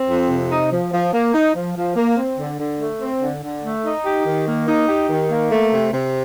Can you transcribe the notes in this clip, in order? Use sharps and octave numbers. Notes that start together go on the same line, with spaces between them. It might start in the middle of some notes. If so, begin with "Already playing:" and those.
Already playing: C4
F2
C3
D#4
F3
F3
A#3
D#4
F3
F3
A#3
C4
D3
D3
A3
C4
D3
D3
A3
D#4
G4
D#3
A#3
D#4
G4
D#3
A#3
A3
C3
C3